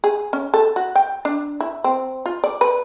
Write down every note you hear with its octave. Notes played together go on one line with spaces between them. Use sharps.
G#4
C#4
A4
F#4
G5
D4
E4
C4
F4
D5
B4